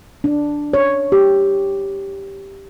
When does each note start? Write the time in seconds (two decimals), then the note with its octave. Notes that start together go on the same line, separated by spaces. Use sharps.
0.24 D4
0.73 C#5
1.12 G4